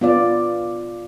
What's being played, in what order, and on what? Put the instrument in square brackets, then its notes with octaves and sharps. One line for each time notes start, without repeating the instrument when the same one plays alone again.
[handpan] B3 F4 D5